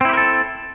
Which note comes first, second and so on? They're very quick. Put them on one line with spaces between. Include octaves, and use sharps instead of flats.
C4 E4 G4 A#4 A4